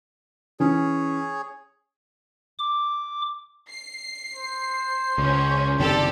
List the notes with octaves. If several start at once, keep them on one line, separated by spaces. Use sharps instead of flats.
E3 C#4 G#4 C#5
D6
C7
C5
C#2 C#4
F#1 C3 D#3 G4 A4 D5